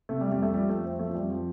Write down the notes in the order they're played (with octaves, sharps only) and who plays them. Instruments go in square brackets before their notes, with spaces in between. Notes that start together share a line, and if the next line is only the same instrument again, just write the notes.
[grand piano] C3 A3
G3
F2 G3
A3
F3 G3
A3
F2
C4
F3 A3
F3
G3
F2
F3